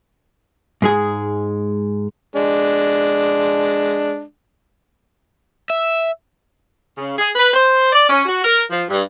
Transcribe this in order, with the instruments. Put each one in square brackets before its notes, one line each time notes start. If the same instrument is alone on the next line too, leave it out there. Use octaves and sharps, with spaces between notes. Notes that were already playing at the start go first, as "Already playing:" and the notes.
[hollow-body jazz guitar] G#2 G#3 G#4
[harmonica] G#3 D4
[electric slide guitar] E5
[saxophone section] C#3
G#4
B4
C5
D5
C#4
F#4
A#4
F3
G2